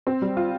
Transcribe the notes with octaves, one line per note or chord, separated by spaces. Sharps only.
C4
G3
F4